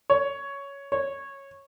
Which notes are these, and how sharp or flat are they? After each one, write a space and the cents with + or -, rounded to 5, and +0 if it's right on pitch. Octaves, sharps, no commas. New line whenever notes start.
C#5 +10
C#5 -10